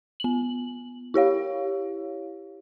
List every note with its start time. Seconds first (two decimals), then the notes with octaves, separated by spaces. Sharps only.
0.20 B3 F#7
1.14 E4 G4 C#5 F5